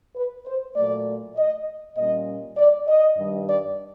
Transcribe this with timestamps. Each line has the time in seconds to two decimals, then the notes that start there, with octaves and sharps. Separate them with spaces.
0.16 B4
0.46 C5
0.75 A#2 F#3 A3 D5
1.36 D#5
1.96 A#2 G3 A#3 C#4 D#5
2.57 D5
2.88 D#5
3.17 G2 D#3 G3
3.48 D5